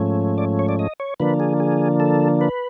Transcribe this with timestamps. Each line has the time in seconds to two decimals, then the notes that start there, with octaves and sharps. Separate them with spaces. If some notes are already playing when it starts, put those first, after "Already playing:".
Already playing: G#2 F3 A3 C#4
0.38 D5
0.59 C#5
0.69 D5
0.79 D#5
1.00 C#5
1.20 D3 F3 A#3 D4 B4
1.40 G#4
1.60 G#4
2.00 A4
2.41 B4